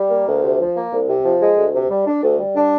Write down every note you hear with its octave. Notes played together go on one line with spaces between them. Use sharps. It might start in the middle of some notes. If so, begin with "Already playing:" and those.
Already playing: G3
A#3
D2
C3
F3
A#3
C2
C3
F3
G#3
D2
C3
G3
D4
D2
G3
D4